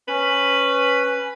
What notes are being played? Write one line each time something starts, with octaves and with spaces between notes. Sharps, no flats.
C#4 B4